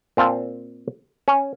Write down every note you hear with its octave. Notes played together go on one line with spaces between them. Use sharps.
A#2 C4 F5 A5
C#4